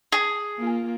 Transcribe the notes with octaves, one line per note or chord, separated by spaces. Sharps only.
G#4
A#3 F4